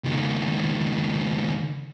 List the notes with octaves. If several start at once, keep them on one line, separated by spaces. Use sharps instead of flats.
C#2 D#3